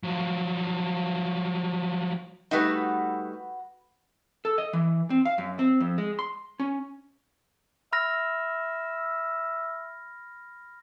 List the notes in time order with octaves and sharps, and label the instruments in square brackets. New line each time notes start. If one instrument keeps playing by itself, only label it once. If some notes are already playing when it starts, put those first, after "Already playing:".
[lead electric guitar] F3 F#3
[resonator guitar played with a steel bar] G3 A3 D#4 [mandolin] F#4 B4
[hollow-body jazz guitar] A4
D#5
E3
C4
F5
F#2
C4
F2
G#3
C6
C#4
[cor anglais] E5 [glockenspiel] B5 F6 A#6